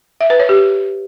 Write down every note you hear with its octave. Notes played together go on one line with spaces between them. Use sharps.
E5
B4
C#5
G4